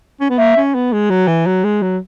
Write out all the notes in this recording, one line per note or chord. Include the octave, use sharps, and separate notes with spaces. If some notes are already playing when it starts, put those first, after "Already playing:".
C#4
B3
A#3 E5
C#4
B3
G#3
F#3
E3
F#3
G#3
F#3